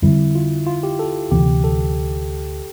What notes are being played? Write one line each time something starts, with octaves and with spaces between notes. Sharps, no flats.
F2 D3 G3 E4
F4
F4
G4
A4
D2 C3 E3 B3 G4
A4